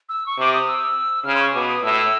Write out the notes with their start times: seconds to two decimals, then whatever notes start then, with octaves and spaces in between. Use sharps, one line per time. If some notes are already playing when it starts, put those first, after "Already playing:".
0.09 E6
0.26 C#6
0.38 C3 D6
0.53 D#6
0.68 E6
1.24 C#3 F6
1.35 C6
1.40 C#6
1.54 B2 D6
1.69 D#6
1.83 A2 E6